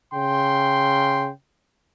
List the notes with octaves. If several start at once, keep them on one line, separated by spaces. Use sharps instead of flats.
C#3 G5 C6